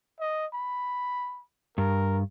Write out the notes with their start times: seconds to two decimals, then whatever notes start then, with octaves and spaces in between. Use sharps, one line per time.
0.20 D#5
0.53 B5
1.78 G2 A#4